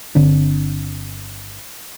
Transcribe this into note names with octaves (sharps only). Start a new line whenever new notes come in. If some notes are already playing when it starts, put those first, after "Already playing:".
G1 D3 C4 D4